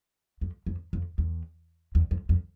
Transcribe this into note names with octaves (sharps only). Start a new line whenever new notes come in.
F2
F2
F2
E2
E2
F2
F2